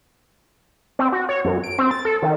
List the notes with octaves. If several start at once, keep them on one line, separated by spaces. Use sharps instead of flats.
C4
F#4
C#5
F#2
D7
C4
A6
A4
D#3